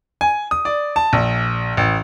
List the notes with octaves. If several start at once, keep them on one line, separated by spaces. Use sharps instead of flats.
G#5
D#6
D5
A5
A#1
A1